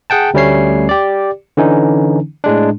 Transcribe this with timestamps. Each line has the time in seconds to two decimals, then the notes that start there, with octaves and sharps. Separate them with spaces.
0.10 G#4 F#5 G5 A5
0.34 D2 G3 A3 C#4 C#5 C7
0.89 G4 D5
1.57 D3 E3 C#4 D#4
2.44 A2 G#3 D4